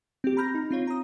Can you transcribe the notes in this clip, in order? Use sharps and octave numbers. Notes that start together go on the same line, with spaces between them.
C4 G4
A#5 B5 F6 G6 A#6
D#4
C4 F4 C#5
A#5 D#6